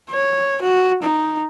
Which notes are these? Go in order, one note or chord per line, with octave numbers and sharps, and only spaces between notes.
C#5
F#4
D#4